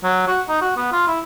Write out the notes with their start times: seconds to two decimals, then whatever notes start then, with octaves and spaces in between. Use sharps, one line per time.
0.03 F#3
0.28 F#4
0.49 D#4
0.62 F#4
0.77 B3
0.92 F4
1.07 E4